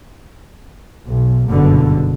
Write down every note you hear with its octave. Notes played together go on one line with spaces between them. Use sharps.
B1
F#1 G2 B2 D3